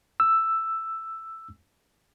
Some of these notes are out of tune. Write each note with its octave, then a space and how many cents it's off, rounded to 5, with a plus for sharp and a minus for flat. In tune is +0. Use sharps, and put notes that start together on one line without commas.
E6 +5